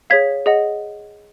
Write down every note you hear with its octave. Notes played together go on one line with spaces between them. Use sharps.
G#4 C#5 F5 G#6 B6
G#4 D#5 F#5